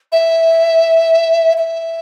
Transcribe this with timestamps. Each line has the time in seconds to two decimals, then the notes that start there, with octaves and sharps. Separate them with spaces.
0.12 E5
1.57 E5